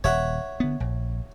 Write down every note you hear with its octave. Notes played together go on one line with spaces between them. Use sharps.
D#1 C#5 E5 F#5
D3 B3
A#1